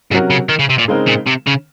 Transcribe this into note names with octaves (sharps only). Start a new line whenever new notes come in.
G#2 C3 F#3 C#4 F#4 A#4
C#3
D#3
C#3
C3
A#2
C#3 G#3 C4 D#4 A#4
A#2
C3
C#3